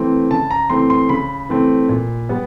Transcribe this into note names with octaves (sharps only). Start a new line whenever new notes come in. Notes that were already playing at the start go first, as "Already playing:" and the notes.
Already playing: E3 A3 C4
C#3 A5
A#5
E3 A3 C4 C6
C6
C#3 B5
E3 A3 C4
A#2
G3 B3